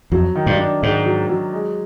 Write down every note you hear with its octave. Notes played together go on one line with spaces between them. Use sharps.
F2 F#3
D#3
G2
D4
G#2 D#3
F#3
F#3
G#3